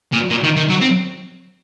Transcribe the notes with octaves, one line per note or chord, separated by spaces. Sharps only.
A#2
A#2
D#3
D#3
F#3
C4